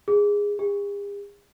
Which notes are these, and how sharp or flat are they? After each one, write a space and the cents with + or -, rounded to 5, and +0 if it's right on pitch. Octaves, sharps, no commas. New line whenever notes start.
G#4 -15
G#4 -45